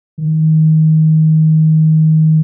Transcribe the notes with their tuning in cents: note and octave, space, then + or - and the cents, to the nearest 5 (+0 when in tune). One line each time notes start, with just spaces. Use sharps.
D#3 +20